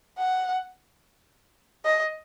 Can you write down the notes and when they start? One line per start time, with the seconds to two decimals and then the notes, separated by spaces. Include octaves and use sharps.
0.19 F#5
1.85 D#5